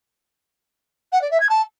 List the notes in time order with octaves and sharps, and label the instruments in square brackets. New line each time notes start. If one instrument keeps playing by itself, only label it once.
[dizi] F#5
D5
E5
G#6
A5